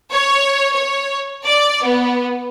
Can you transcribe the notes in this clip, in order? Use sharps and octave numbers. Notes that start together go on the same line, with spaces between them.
C#5
C#5
D5
B3